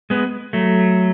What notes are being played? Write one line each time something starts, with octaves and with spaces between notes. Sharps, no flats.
G#3 B3
F#3 A3